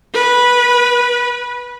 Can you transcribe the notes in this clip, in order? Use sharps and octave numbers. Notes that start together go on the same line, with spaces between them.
B4